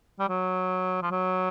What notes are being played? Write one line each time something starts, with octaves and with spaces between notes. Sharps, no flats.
G3
F#3
F3
F#3